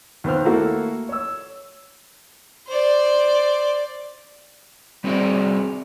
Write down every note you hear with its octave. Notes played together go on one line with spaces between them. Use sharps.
D#2 B3 F4 C5 F6
A3 A#3 E4 F#4 A4
C#5 E6
C5 D5
G3 C4 F#4 G#4 C#5 D5